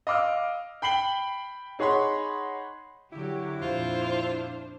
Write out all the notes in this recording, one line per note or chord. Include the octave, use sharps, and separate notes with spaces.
D#5 F5 D6 E6 F6
G5 B5 C7 F#7 G7
D#4 G#4 C#5 F#5 B5 C6
D3 F#3 E4 G4
F2 A#2 D4 F4 C5